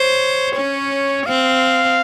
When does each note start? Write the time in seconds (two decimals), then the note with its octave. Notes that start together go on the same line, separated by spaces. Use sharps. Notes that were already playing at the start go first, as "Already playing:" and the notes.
Already playing: C5 C#5
0.56 C#4
1.26 C4 F5